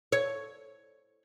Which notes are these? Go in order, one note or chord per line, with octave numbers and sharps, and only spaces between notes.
C#5